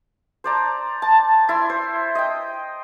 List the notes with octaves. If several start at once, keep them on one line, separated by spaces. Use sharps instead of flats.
C5 D5 A#5
A5
E4 C6
C5
D#5 G5